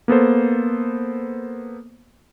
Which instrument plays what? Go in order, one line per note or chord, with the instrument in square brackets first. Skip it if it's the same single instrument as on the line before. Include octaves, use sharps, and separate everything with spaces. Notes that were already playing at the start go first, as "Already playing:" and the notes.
[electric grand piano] A#3 B3 A4 C5